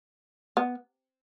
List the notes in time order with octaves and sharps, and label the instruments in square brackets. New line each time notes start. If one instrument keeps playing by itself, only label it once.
[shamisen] B3